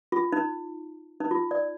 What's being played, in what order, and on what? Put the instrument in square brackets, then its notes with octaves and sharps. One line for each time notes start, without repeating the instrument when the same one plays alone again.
[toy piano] F4
D#4
D#4
F4
D5